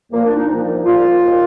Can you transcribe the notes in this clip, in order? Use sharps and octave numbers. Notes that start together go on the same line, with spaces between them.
C2 A#2 F3 A#3
D4
D#4
C2 A#2 F3
C2 A#2 F3 F4
D#2 D#3